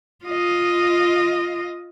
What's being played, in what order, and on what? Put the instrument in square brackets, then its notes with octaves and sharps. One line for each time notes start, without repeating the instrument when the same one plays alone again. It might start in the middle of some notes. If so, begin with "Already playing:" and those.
[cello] F4 D#5